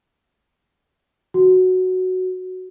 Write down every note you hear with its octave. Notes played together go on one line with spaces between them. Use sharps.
F#4